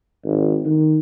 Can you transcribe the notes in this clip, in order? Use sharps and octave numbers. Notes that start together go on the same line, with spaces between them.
G#1
D#3